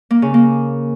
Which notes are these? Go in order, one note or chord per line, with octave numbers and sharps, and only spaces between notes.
A#3
C#3
A#3